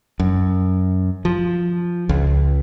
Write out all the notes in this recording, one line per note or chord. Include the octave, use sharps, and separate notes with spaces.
F#2
F3
C#2